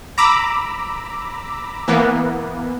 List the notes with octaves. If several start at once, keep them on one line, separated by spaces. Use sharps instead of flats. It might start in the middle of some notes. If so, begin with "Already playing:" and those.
A#5 B5 D6 E6
E3 A#3 B3